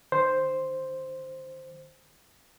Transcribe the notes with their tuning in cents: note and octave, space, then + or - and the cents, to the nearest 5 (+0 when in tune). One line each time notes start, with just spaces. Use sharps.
D#3 -40 C5 +0